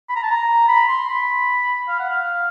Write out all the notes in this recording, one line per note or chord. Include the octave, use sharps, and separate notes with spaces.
B5
A#5
A5
A#5
B5
C6
B5
F5
F#5
F5